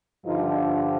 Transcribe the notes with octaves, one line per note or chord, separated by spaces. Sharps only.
G2 D3 F3 D#4 F4